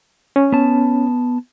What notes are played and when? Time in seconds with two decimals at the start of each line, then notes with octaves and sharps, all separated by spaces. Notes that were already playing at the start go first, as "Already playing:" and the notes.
0.36 C#4
0.52 B3 A5